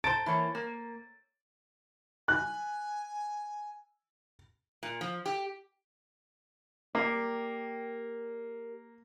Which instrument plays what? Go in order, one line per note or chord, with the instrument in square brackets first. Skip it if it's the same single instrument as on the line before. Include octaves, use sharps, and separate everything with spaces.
[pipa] A4 C5 [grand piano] A#5 A6 D7
[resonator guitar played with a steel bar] E3 A#3 C#5
A#3
[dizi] G#5 [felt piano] F#6
[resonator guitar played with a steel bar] A#2
F3
G4
[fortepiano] A#3 [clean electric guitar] G4 A#4 D5